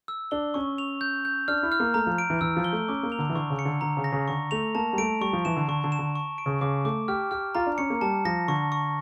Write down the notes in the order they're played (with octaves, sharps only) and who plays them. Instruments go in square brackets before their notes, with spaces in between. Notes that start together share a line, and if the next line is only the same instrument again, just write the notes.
[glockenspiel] E6
[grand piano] D4 [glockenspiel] G7
[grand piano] C#4 [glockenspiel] C#6
[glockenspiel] F7
G6
G6
[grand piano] D4 [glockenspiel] F6
[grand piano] E4
[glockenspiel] F6
[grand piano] A#3
[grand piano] A3 [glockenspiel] A#5
[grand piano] F3
[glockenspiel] D7
[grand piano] E3
[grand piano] E3 [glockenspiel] E6
[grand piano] F3
[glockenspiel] G7
[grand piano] A3
[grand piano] C#4 [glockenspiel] D6
[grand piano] A#3
[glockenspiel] F7
[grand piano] D3
E3
[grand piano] D3 [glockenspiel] C#6
[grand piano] C#3
[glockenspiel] C#7
[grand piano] D3
[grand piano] D3 [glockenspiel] A#5
[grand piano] C#3
[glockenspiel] A#6
[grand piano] C#3
[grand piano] D3 [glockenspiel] C#6
[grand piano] A3 [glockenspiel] F7
[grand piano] A#3 [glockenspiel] A5
[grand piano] G3
[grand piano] A3 [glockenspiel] D7
[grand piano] G3 [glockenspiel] C#6
[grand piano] F3
[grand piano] E3 [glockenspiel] E7
[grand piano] D3
[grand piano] D3 [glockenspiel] C#6
[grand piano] D3
[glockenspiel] E7
[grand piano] D3
[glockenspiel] C#6
D7
[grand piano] C#3
[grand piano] C#3 [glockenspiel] D6
[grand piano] A3 [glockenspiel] D6
[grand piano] G4 [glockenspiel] F6
[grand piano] G4 [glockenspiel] F6
[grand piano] F4 [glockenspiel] A#5
[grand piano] D4
[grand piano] C#4 [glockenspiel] C#7
[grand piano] A#3
[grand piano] G3 [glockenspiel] A5
[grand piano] F3 [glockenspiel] A#6
[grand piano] D3 [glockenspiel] C#6
[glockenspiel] C#6